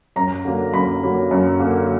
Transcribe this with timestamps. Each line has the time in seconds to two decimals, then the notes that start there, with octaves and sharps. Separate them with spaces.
0.16 F#2 A#5
0.45 D3 F#3 A#3
0.73 F#2 B5
1.02 D3 F#3 A#3
1.31 F#2
1.60 D3 F#3 A#3